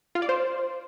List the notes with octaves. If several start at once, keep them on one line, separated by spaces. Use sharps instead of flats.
F4
D5
C5